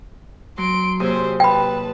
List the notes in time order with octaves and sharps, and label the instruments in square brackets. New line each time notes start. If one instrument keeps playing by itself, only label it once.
[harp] F#3 [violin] C6 D7
[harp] D#2 C3 G#4 [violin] C5 C#5
[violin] B4 A5 [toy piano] G5 B5